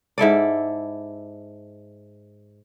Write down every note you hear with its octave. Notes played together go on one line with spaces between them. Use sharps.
G#2 E4 A4 D5